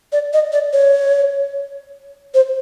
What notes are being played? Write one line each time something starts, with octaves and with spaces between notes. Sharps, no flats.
D5
D#5
D5
C#5
C5